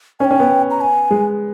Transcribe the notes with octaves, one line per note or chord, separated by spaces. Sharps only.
C#4 G#5
G5
C#4
B3
A#5
G#5
G#3